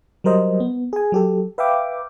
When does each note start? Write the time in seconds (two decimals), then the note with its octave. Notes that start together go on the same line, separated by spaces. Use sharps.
0.24 F#3 G3 A#4 C5 D#5
0.60 B3
0.93 G#4 G#5
1.12 F#3 G4 A4
1.58 B4 E5 F5 G5 D6